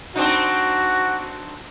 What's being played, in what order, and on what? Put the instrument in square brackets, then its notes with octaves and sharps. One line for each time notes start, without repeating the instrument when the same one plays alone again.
[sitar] C4 D4 D#4 [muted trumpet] F#4